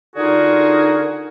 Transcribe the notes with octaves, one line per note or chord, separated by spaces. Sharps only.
D3 D#4 F4 F#4 G#4 A#4